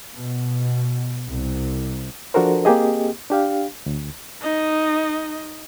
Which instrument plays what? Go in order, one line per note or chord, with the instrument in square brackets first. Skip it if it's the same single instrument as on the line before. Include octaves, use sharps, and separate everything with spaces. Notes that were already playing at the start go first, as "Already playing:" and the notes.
[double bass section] B2
C2
[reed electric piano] F3 D4 F#4 A4 A#4 C5
A#3 C4 G4 G#4 D#5
D4 G4 F5
D2
[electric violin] D#4 D#5